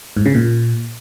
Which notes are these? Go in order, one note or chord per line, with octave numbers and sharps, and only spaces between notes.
G#2
C#3
A#2